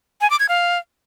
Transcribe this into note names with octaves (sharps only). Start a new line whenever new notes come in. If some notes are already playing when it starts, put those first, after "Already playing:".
G#5
D6
G#6
F5